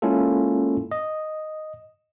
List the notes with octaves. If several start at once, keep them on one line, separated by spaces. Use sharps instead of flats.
G#3 A#3 C#4 E4 F4 A4
D#5